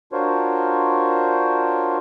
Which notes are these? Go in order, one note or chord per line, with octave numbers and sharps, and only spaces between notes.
D4 F4 F#4 A#4 C5 C#5